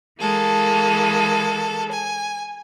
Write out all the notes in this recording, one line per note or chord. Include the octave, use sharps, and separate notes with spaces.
E3 G#3 A#3 A4
G#5